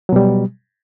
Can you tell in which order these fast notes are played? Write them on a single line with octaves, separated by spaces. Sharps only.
F#3 B2 G3